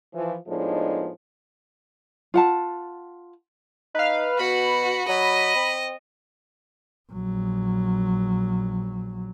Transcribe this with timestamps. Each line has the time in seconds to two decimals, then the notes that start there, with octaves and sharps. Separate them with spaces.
0.14 E3 F3
0.49 A2 F3 G#3 B3 D4 D#4
2.34 F4 F#5 A5
3.95 D#4 B4 F5
4.39 B2 F#4 B5
5.08 F#3 D#5
5.56 C4
7.11 A#1 F#3